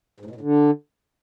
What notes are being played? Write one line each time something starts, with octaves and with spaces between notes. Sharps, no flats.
G#2
A2
B2
A2
D3